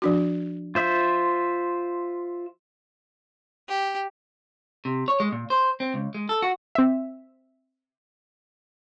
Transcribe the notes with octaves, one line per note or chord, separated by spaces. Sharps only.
F3 D4 F#4
F4 C5 E5
G4
C3
C#5
G#3
A#2
C5
C4
C#2
G#3
A4
F#4
C4 E5